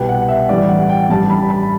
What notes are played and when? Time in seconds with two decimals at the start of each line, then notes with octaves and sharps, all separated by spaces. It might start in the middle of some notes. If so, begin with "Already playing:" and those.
Already playing: C2 B2 G3 B3 G5
0.09 F#5
0.29 E5
0.49 A1 G2 E3 G3 D5
0.69 F#5
0.89 G5
1.10 A1 G2 E3 G3 A5
1.30 B5
1.50 B5